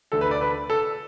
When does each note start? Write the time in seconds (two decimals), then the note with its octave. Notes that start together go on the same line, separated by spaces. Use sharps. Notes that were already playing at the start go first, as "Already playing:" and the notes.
0.12 D2 D3 A3 A4
0.21 B4
0.31 D5
0.41 B4
0.70 A4